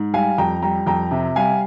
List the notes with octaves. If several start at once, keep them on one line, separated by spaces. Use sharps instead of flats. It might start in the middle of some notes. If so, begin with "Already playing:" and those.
Already playing: G#2
G3 F5 G#5
F2 G5 A#5
G3 G5 A#5
F2 G5 A#5
C3
G3 F5 G#5